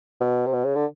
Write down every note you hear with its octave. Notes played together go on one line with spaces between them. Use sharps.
B2
C3
B2
C#3
D3